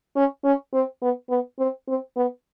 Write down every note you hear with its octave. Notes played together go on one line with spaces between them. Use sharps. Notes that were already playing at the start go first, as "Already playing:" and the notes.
C#4
C#4
C4
B3
B3
C4
C4
B3